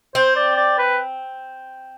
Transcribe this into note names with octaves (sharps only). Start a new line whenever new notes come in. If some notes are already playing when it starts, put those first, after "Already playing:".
C4 C5
D5
D5
B4